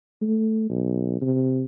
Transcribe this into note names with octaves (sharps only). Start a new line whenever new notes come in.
A3
B1
C3